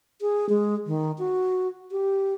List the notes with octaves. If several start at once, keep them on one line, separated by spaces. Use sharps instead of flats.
G#4
G#3
D#3
F#4
G4